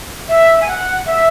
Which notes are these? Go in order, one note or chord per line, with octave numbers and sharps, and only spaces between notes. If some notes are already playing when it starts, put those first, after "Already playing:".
E5
G#5
F#5
E5